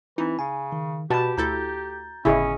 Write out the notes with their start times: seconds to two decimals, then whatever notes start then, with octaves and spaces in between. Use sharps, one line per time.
0.18 E3 C4 D#4 E4
0.39 C#3 G#5
0.72 D#3
1.10 B2 F#4 G4 B4 A5 B5
1.38 D2 E4 A4 A#5 G6 A6
2.25 G1 A2 C#3 C#4 E4 G#4 D#5